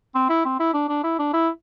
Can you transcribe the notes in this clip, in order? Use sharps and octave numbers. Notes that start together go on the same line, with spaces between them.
C4
E4
C4
E4
D4
D4
E4
D4
E4